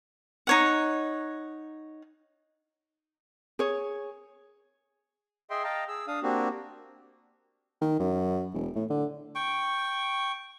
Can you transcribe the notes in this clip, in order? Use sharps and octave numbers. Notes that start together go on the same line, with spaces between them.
D#4 C#5 F#5
G#4 C#5
G#4 D#5 E5 G5 C6
D#5 F5 G5 A5 A#5
G#4 E6
D4 F5 D#6
A#3 C4 D4 F#4 G4
D#3
F#2
E1
A2
D3
G5 C#6